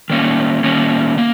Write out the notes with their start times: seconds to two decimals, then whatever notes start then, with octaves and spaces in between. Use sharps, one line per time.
0.10 D#3 A#3 C#4
0.64 D#3 A#3 C#4
1.18 A#3